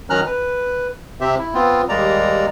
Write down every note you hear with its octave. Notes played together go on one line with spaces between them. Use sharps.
D#3 F#3 C#4 A#5 F6 F#6
B4
C3 C4 G4 E5
E4
B3 C4 F4
D#2 G3 G#3 A#3 D5 A#5